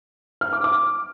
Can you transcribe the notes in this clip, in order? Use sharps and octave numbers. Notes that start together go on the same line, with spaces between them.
F6
D6
D6